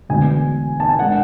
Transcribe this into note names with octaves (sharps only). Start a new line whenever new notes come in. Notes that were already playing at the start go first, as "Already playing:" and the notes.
E1 D2 D3 G#3 B3 G#5
A5
G#5
G#3 D4 F#5